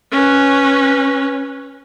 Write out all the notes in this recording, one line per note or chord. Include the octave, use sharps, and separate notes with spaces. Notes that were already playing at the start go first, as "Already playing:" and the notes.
C#4 B4